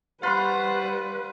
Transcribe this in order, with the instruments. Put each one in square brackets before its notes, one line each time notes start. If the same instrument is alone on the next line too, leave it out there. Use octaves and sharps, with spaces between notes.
[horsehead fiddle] G3 B4 [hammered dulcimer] F4 B5 C#6 [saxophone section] C5 F#5